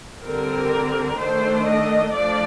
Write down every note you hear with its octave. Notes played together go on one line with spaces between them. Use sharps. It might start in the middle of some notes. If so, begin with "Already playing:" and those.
D3 G3 C4 A#4
D#3 A3 D4 C5
D#5
F3 A3 D4 D5